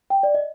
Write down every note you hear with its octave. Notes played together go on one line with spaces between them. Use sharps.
G5
D5
D#5